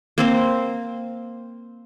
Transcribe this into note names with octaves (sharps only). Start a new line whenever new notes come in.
A#3 C4 C5